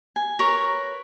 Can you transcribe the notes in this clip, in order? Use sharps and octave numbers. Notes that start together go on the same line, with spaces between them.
G#5
A#4 B4 C#5 C#6